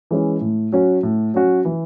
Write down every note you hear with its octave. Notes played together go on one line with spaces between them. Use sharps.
E3 G#3 C#4 E4
A2
F#3 C#4 F#4
A2
F#3 C#4 F#4
E3